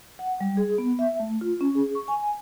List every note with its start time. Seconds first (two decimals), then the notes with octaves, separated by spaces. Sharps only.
0.19 F#5
0.41 G3
0.57 G#4
0.78 B3
0.99 E5
1.20 A3
1.41 F4
1.61 C#4
1.75 G#4
1.95 C#6
2.08 G#5